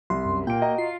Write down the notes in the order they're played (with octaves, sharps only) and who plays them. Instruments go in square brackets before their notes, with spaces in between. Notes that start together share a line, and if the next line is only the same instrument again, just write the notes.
[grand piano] C2 [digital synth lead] C6
[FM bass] F#2
[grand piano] A#2 D7 [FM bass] A#3 [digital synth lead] G5
[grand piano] F#4 D#5 A#5
[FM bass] F4 [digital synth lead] C7